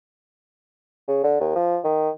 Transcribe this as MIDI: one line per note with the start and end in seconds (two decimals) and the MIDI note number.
1.08 1.21 49
1.23 1.36 50
1.40 1.52 39
1.55 1.78 53
1.84 2.10 51